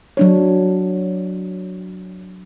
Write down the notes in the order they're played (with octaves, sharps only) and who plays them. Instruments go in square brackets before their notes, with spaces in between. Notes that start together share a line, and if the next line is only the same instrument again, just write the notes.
[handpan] F#3 D4 C#5